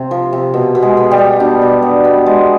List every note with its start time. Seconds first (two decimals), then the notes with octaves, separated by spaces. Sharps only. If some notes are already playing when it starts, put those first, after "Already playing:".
Already playing: C3 C4 C5
0.11 F3
0.33 C3
0.54 B2
0.75 B2
0.82 G#3 G#4
0.97 B3
1.11 G3 G4
1.18 B3
1.40 B2 D4
1.62 B2
1.82 B3
2.04 B3
2.26 G#3